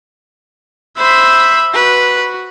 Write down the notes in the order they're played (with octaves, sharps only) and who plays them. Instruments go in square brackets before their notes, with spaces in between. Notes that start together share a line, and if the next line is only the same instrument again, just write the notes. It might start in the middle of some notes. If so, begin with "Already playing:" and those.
[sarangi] C5 [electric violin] E5 B5
[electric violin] F#4 [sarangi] B4